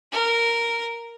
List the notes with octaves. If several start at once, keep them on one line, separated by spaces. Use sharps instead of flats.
A#4